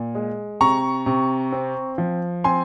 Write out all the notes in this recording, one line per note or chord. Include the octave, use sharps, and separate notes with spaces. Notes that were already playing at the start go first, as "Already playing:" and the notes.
Already playing: A#2
G#3
C3 A#5 C#6
C3
C4
F3
C4 G#5 C6